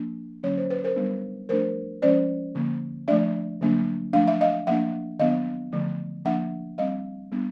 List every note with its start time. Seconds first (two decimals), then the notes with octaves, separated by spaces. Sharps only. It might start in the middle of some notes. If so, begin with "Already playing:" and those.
Already playing: F3 A#3 D4
0.43 D3 F#3 A#3 C#4 C#5
0.57 C5
0.70 B4
0.84 A#4 C5
0.96 G3 B3 D4
1.49 F3 A3 D4 A#4 C5
2.02 F3 G#3 C#4 C5 D5
2.55 D3 F3 A#3
3.08 F3 A3 D4 D5 E5
3.61 D3 F#3 A#3 D4
4.13 F3 A3 D4 F5
4.28 E5
4.41 D#5 F5
4.67 F3 A#3 D4 E5 F#5
5.19 D#3 F#3 B3 D4 D#5 F5
5.72 D3 F3 A3
6.25 F3 A#3 D4 E5 F#5
6.78 G3 C4 D#5 F5
7.32 G3 B3 D4